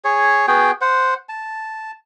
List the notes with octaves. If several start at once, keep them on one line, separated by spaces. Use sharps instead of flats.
G#4 C#5
B3 F#4 G#4 G5
C5 F#5
A5